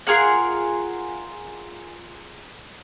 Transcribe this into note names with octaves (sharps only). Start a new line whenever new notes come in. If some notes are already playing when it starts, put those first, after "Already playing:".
F4 G#4 A#4 F#5